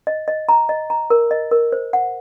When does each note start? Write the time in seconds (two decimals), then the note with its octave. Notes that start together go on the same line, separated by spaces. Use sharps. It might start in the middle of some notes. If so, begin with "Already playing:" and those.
0.07 D#5
0.28 D#5
0.49 A#5
0.69 D#5
0.90 A#5
1.10 A#4
1.31 D#5
1.51 A#4
1.72 C5
1.93 F#5